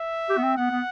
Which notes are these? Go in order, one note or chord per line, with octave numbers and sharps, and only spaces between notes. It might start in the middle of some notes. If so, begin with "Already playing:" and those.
Already playing: E5
G4
B3
C4
B3 F#5
B3